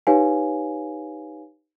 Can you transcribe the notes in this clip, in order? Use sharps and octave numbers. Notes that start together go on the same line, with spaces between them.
D#4 G4 B4 C#5 F5 G#5